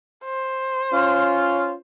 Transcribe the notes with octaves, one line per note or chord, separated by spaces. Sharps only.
C5
C#4 F4